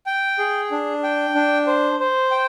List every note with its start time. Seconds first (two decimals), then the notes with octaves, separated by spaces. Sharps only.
0.06 G5
0.39 G#4
0.71 D4
1.04 G5
1.35 D4
1.67 C5
2.00 C5
2.31 G5